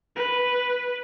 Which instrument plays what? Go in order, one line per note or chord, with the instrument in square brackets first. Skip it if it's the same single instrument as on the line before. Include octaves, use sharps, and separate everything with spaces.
[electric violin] B4